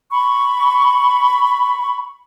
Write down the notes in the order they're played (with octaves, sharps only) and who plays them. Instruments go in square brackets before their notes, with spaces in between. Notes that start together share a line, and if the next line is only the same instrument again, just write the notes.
[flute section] B5 C#6